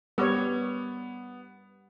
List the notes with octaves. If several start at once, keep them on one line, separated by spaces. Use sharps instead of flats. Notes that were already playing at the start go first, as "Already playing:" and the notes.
G3 B3 A#4 B4 C#5 D6